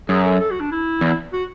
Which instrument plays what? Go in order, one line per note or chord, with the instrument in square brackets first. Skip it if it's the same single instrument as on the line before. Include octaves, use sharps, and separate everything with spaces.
[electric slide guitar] F#2 [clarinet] G#4
[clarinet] A4
A4
F#4
D4
E4
[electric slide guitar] E2
[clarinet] F#4